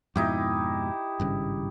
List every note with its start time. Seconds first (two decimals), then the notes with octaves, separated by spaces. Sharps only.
0.16 F2 G#2 B2 D#4 E4 G4
1.20 G#1 G2 C#3